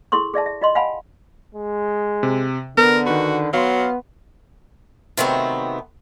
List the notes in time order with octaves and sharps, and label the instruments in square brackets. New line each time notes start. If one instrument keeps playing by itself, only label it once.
[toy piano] E4 G#4 A4 C6 C#6
G#4 D5 E5 A5
E5
F4 D#5 C6
F5 F#5 G#5 A5 B5
[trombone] G#3
[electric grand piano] C3
[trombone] D3 [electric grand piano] B3 [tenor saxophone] A#4
[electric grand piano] D#3 B4 [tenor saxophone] F#4
[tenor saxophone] F#3 [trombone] B3 [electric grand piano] F5 C6
[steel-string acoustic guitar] C3 D#3 F#3 A3 B3 C4